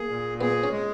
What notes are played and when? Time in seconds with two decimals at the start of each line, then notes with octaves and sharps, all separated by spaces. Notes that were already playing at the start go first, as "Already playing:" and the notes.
Already playing: A#3 G#4
0.09 A#2
0.41 B3 G#4
0.63 C#4
0.72 G#3